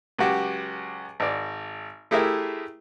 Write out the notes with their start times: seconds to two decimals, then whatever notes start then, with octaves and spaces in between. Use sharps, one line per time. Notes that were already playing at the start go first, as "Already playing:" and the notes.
0.19 C#2 F#3 F#4 G4
1.20 G#1 D5
2.11 A3 E4 G4 G#4 A#4 E5